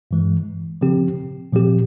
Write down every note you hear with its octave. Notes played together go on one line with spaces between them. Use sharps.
G2 E3 G#3
C#3 F3 C4 G4
A#2 F3 C4 G4